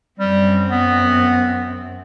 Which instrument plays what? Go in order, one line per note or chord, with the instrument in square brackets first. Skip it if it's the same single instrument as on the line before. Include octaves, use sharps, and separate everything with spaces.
[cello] F#2 C4 [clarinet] G3
[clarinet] B3